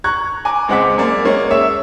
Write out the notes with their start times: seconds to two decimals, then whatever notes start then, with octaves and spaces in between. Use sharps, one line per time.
0.04 A#5 C#6 F#6 G#6
0.45 G#5 A#5 D6
0.68 C#2 G#3 C4 F#5 D6 B6
0.98 F#2 A#3 D5
1.25 G#3 A#3 C#4
1.50 G#4 C#5 E5 E6